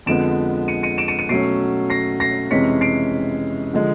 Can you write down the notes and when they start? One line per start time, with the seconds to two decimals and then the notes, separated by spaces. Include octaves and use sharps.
0.06 F2 D3 F3 G#3 B3 D7 E7
0.68 C#7 D#7
0.83 C#7 D#7
0.98 D7 E7
1.08 C#7 D#7
1.19 C#7 D#7
1.29 B2 F#3 A3 C#4 C7 D7
1.90 A#6 C7
2.20 A#6 C7
2.51 F2 C3 E3 G#3 C#4 B6 C#7
2.81 C7 D7
3.73 D3 F3 G#3